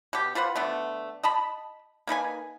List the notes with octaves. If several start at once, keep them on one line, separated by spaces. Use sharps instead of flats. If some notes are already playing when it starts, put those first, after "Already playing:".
B2 G4
F4 B4 C5 F#5
D3 A3 B3
D#5 A5 B5
A#3 D#4 B4 G#5